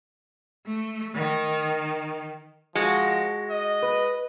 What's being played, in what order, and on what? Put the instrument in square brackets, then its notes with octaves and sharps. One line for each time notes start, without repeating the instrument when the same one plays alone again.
[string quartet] A3
D#3
[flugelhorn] F3 [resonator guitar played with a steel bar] G#3 [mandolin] F#4
[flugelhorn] D#5
[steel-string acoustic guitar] B4